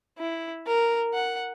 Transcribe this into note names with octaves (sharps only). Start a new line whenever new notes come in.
E4
A#4
F#5